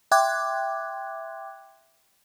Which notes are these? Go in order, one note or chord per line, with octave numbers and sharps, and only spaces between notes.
E5 G5 C6 D6 F#6 G#6